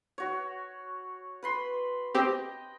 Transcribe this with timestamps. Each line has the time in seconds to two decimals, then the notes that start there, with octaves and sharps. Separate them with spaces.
0.18 F#4 C#5
1.43 B4 B5 C6
2.15 C4 G4 D#5 G5